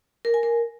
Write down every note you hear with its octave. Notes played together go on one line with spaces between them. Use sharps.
A#4
G#5
A#4